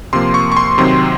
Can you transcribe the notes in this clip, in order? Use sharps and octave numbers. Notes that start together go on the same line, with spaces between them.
C3 F3 A#3 C6
C#6
C#6
C6
C3 D#3 F#3 C4 C6